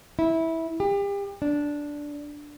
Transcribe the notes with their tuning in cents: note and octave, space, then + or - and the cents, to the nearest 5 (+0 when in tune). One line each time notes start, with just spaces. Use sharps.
E4 -15
G4 +35
D4 -5